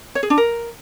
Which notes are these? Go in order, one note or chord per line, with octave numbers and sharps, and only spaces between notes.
C#5
G#4
D4
A#4